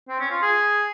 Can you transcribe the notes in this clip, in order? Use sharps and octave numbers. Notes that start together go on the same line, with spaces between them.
C4
C#4
F4
G#4